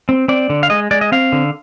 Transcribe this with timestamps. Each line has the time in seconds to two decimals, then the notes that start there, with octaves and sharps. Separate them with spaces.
0.09 C4
0.28 C4 D5
0.50 D3
0.63 F5
0.70 G#3 D#5
0.91 G#3 D5
1.01 D#5
1.12 C4 F5
1.32 D3